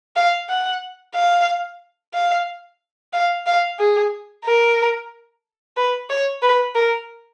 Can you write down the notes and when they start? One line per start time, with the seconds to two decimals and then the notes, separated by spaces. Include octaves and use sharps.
0.16 F5
0.49 F#5
1.14 F5
2.14 F5
3.13 F5
3.46 F5
3.79 G#4
4.45 A#4
5.77 B4
6.09 C#5
6.42 B4
6.75 A#4